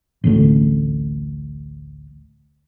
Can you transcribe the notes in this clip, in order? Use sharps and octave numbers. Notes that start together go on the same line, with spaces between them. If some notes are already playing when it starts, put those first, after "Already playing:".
A1 D2 A2